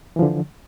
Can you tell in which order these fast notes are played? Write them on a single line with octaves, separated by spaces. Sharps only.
E3 F3 D3